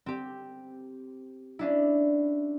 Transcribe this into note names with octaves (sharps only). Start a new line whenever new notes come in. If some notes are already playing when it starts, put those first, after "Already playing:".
C4 G4
C#4 D4 E4